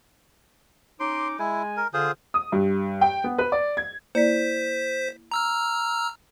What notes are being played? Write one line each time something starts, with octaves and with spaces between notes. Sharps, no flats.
C#4 D#4 C6 D6
G#3 E4 G#5
A#4
D3 F4 G#4 C5
D#6
G2
G5
B3
B4
D5
G#6
A#3 E4 C5 D5 B6
A#5 E6 F6